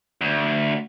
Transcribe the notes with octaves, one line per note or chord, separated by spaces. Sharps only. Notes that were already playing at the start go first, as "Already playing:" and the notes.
D2